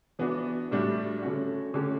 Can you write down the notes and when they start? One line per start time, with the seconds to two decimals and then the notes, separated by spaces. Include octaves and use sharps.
0.19 E3 B3 D4 F#4
0.71 A2 G3 D4 F#4
1.23 D3 A3 C#4 F#4
1.74 D3 A3 C#4 G4